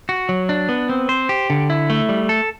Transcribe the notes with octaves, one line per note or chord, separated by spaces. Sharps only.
F#4
F#3
D4
B3
C4
C5
G4
D3
E4
A3
G3
A4